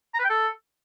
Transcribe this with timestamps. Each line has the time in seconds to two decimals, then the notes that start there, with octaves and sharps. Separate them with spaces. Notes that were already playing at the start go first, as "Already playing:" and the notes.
0.14 A#5
0.19 B4
0.24 G5
0.29 A4